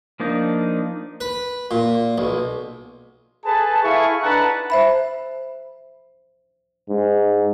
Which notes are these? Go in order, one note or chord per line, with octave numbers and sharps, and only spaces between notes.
F3 A#3 D4 D#4
B4
A#2
B1
G#4 A4 B4 A5
E4 G#4 A4 E5 F5 C#6
D4 D#4 B4 F#5 A5 A#5
C5 E5 B5
G#2